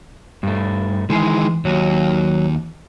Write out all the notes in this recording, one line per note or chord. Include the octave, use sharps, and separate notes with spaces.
G2 A3
D#3 E3 G#3 G#4
D#2 F#3